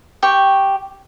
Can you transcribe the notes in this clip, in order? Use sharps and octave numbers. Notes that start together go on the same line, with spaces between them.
G4 G5 C#6